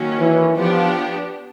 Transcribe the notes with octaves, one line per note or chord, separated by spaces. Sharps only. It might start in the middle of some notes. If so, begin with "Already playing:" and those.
Already playing: D#3 F#3 A#3 C#4
E3
F3 B3 D4 G4